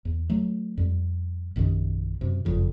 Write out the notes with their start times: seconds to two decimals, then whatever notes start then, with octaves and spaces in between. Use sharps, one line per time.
0.05 E2
0.30 F#3 A3
0.77 F2 G3
1.56 A#1 F#2 C3 D#3
2.21 F#2 C3
2.45 F#1 F2 C#3